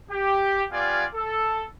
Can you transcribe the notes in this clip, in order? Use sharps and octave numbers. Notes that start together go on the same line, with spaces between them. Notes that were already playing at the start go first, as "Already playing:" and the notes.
G4
B3 F4 G4 D5 F5 G#5
A4